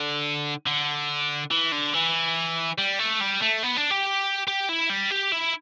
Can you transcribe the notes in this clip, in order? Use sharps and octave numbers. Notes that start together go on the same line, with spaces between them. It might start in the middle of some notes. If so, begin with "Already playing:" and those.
Already playing: D3
D3
E3
D3
E3
G3
A3
G3
A3
B3
D4
G4
G4
E4
G3
G4
E4